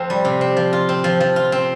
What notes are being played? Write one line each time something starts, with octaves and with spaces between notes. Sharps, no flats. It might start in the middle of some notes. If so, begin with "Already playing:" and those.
Already playing: F2 C4
G3
C3
C4
F3
F4
C4
F3
F3
F4
C4